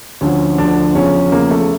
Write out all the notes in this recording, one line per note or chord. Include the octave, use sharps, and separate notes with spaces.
D2 D3 F3 C#4
D2 D3 F3 D4
E2 C#3 F3 C#4
E2 C#3 F3 A#3
A3